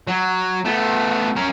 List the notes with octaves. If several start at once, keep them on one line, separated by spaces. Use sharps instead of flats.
F#3
A3 B3
C#4 A#4